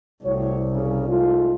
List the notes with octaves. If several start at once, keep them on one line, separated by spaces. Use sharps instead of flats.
C2 A2 F#4 C#5
C#3
G#2 A3 F4